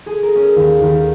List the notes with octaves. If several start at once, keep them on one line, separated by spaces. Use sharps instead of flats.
G#4
A#4
C#4
D#2
D#2